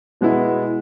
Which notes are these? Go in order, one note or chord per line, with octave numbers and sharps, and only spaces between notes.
B2 G#3 B3 E4